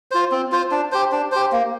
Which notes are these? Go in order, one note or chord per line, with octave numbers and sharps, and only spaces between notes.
F4 C5
C4
F4 C5
D4
G4 C5
D4
G4 C5
A#3